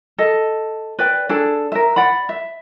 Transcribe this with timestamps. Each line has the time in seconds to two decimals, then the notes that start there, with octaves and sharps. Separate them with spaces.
0.18 A4 D#5
0.99 B4 D5 G5
1.29 D4 G#4 A4
1.72 A#4 E5
1.96 D5 F#5 B5
2.29 E5